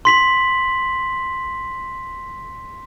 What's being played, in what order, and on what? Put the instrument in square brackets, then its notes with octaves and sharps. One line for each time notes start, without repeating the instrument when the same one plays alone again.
[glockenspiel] C6 B6 F#7